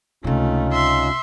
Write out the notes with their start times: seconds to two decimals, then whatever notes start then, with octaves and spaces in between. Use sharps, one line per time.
0.24 C#2 C3 A3 C#4 D#4 F4
0.73 E5 C6